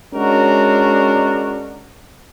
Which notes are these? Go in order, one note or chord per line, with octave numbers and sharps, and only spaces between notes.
G#3 C#4 D4 F#4 A#4